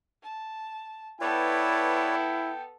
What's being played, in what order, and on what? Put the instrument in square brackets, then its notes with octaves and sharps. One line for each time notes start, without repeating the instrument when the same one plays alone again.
[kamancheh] A5
[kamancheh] B3 A4 [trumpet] E4 [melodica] B4 C#5 D5 [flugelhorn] G5